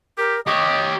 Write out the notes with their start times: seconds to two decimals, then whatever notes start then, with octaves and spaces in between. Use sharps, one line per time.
0.18 G4 A#4
0.47 G4 C#5 D#5 D6